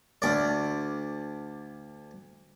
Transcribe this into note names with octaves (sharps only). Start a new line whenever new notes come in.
D2 D5